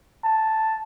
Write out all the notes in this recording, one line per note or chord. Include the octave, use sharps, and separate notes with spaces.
A5